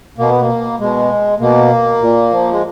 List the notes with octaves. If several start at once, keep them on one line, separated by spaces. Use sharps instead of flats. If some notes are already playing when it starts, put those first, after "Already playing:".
B2 A#3
B3
A#3
B2 G#3
B2 A#3
A#2
F3
G#3